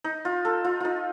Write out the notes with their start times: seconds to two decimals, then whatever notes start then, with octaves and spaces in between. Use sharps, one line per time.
0.04 D#4
0.25 F4
0.45 A4
0.65 F4
0.80 D#4 F4